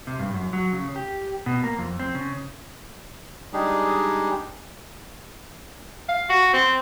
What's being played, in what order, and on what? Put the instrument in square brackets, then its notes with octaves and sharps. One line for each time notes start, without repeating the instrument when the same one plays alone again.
[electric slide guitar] C3
G2
F#2
F#3
C#3
G4
B2
A#3
F2
C4
C#3
[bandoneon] G3 G#3 D4 D#4 G4 G#4
[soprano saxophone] F5
F#4
C4